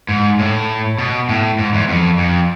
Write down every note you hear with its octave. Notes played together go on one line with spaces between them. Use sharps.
G#2
A2
B2
A2
G#2
E2
F2
F2